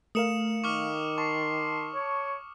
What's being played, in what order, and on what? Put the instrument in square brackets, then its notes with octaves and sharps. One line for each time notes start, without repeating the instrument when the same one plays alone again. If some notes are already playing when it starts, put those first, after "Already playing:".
[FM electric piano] A3 A#4 F5 [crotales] D#6 C#7 E7
[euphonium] D#3 [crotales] C#6 D6 F6
[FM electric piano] A5 [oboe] C6 [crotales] C#6
[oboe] C#5